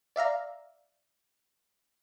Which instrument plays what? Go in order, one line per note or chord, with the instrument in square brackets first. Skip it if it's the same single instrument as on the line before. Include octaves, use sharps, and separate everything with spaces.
[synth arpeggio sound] D5 E5 F5 A#5